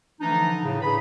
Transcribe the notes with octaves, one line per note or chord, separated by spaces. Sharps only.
D3 E3 F3 A3 D4 D#4
A2 C#3
A2 D4 G#4 B4 B5